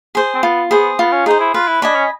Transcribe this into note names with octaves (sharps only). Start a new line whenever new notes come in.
G#4 C5
C4
B3 F4
B3 G#4 C5
B3 F4
C#4
D#4 G#4 C5
E4
F4 B4
E4
D4 D#5 G#5 B5
C#4